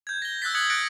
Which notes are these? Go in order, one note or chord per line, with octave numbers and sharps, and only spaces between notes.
G6 G#6
A#6 G7
E6 F#6 G6 A6 B6
D#6 E6 F#6 G#6 C#7 F#7
F#6 G6 A6 A#6 C#7 D7